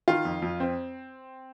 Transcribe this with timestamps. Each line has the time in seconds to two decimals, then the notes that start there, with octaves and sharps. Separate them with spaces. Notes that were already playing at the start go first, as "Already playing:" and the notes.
0.08 D#3 F4
0.25 F2
0.42 F2
0.60 C4